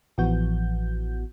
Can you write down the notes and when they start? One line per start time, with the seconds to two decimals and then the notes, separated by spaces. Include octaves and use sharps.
0.18 A1 E3 F3 B3 F#4 G6